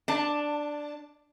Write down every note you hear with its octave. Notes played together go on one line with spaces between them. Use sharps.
D4 A5